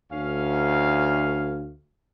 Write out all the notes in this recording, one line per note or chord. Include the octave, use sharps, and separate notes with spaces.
D2 C#4 F5